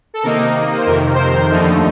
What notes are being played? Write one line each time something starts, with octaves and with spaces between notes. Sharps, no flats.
A4
C3 D#3 A#3 D#4 A#4
C5
F2 C3 D#3 A#4
C5
A#4
D#2 D3 F3 A3 D#4